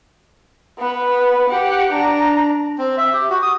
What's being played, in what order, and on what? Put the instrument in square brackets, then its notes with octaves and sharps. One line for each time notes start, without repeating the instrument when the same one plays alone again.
[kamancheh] B3 B4
G4 F#5
D4 A#5
[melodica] C4
E5
G4
F#4
D#6